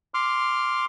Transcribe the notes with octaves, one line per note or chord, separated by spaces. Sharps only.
C6 D6 F6